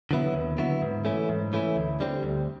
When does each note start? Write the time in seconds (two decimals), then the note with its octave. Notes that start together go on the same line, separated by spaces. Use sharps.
0.11 D3 F#3 B3 E4
0.34 D#2
0.58 D3 F#3 B3 E4
0.82 G#2
1.05 E3 A3 C#4 E4
1.29 G#2
1.53 E3 A3 C#4 E4
1.76 D2
2.00 D3 G3 C4
2.23 D2